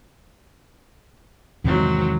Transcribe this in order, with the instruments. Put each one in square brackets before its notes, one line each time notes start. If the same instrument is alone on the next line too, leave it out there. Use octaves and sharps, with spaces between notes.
[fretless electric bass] E2 C3 D#3 [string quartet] G#2 F#3 C4